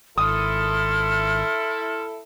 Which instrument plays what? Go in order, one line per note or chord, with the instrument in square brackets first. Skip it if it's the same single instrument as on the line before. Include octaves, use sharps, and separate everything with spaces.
[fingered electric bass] G#1 [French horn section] E4 A4 [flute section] C6 F6 [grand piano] D#6